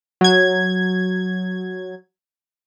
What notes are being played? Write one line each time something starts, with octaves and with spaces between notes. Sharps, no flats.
F#3 G#6